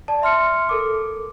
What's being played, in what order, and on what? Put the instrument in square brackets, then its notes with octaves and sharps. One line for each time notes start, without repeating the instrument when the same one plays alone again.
[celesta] D5 A5
E5 C6 F6 C#7
A4 A#4 D6